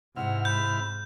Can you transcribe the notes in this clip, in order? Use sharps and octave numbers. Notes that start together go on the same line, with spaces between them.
G#2 C3 E4 F#5 F6
B5 G6